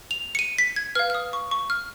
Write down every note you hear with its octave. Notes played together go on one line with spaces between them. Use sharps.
F7
C#7
D#7
B6
G#6
B4 F5 F6
F6
D#6
C#6
C#6
F6